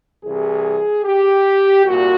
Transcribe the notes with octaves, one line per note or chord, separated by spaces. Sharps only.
C2 C3 E3 G#4
G4
C2 A#2 F#4